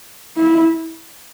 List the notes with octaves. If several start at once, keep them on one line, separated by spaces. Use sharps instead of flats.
E4